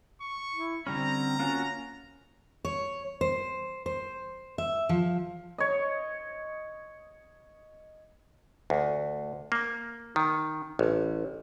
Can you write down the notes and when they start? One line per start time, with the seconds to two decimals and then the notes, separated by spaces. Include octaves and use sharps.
0.21 C#6
0.55 E4
0.87 D3 G3 C4 C#4 A#5
1.39 A#3 C#4 F4 F#4
2.65 C#5
3.21 C5
3.86 C5
4.58 E5
4.89 F3
5.58 C#5 D#5
8.70 D2
9.52 A#3
10.16 D#3
10.79 A1